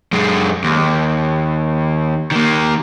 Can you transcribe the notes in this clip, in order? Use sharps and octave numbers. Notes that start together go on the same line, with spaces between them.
F#2 G#3
D#2
D#3 A#3